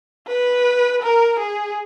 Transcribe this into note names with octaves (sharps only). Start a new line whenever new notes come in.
B4
A#4
G#4